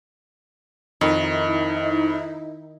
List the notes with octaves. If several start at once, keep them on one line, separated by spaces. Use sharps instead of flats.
F2 D#3 D#4 E4